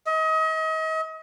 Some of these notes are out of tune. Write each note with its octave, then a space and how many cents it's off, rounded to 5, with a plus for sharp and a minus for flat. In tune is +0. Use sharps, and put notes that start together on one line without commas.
D#5 +35